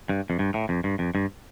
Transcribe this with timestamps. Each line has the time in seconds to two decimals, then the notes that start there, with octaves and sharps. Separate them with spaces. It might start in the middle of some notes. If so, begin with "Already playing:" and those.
0.09 G2
0.30 F2
0.39 G2
0.54 A2
0.69 F2
0.84 G2
0.99 F2
1.15 G2